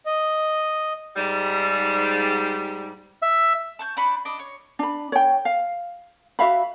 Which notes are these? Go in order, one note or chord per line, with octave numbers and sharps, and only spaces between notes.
D#5
G#2 G3
E5
A5 C#6 G6
D4 B4 B5 C#6
D4 D#5 D6
C#5
D4 B5
C#5 G5
F5
F#4 E5 F5 B5